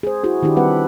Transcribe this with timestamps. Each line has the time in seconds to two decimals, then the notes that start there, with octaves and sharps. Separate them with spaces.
0.03 G#4 C5
0.24 E4 F#4 G#4
0.42 D#3 D4 E4 G4
0.56 G3 C4 B4 F#5